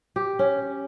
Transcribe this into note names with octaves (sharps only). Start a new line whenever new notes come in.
G4
C#4